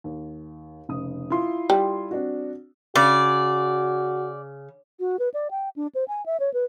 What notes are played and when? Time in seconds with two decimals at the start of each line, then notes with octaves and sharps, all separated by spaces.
0.04 D#2
0.89 F1 C#3 D#6
1.30 E4 F4 C6
1.70 G3
2.11 C4 D4 F#4
2.96 C#3 F#4 D5
5.00 F#4
5.19 B4
5.34 D5
5.51 G5
5.76 D4
5.95 C5
6.08 G#5
6.26 E5
6.40 C#5
6.53 B4